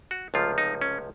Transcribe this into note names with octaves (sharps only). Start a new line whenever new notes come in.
F#4
C#2 C3 F3 A3 F4
D#4
C#4